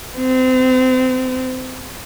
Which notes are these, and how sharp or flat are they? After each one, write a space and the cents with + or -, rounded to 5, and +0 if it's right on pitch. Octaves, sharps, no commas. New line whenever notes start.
C4 -30